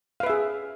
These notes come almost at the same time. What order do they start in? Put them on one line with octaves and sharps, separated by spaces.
F5 B4 E5 G#4